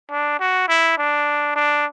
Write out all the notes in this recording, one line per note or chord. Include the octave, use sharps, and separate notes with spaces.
D4
F#4
E4
D4
D4